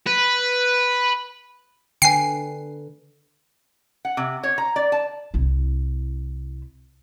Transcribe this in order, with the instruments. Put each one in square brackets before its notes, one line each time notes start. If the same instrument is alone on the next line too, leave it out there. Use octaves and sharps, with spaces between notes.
[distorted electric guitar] B4
[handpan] D3 B4 [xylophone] G5 G#5 [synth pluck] C7
[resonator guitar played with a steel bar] F#5
C3
C#5
A#5
D5
A5
[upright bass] C2 E4